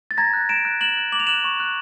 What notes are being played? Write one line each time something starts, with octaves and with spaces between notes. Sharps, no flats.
A6
A#5 G#6 A#6
F#6
A#5 D7 E7
F#6
F#6 E7 F#7
F#6
D6 F#7
F7
F#6 E7 F#7
C#6
F#6